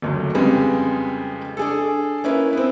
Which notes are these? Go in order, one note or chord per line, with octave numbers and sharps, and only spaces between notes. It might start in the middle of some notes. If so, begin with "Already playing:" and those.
F#1 D2 F#3
F2 C#3 G3 G#3 B4
D4 G#4 A4
A#3 C#4 E4 B4
B3 C4